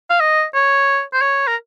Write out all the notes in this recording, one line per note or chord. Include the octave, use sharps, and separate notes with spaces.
F5
D#5
C#5
C5
C#5
A#4